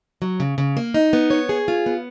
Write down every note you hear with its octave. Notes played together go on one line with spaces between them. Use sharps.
F#3
C#3
C#3
A#3
D#4
B3
C#5
G#4
F4
B3